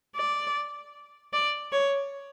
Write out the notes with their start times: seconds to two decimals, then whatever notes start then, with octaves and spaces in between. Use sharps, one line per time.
0.16 D5
1.33 D5
1.72 C#5